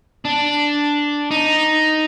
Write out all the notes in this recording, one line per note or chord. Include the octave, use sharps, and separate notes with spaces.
D4
D#4